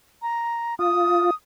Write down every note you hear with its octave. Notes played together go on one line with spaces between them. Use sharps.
A#5
F4 D#6